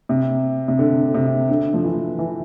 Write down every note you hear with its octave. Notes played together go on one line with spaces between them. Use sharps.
C3
C3
D3
C3
D3
F3
E3
E3